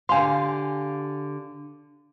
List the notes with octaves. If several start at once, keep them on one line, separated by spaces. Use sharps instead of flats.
D3 G4 F5 G#5 C6